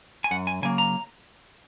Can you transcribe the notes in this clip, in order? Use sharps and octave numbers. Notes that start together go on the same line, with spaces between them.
G#5
F#2 F#5
G#5
C#3 F#3 A#3 G#5
A#5